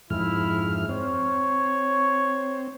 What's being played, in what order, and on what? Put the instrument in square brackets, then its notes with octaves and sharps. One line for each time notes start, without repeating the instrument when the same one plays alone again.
[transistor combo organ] F2 G#2 F6 [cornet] E4
[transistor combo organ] C4 [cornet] C#5